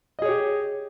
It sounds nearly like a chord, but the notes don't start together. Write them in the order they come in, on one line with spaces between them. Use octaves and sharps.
D#5 G#4 C#5 G4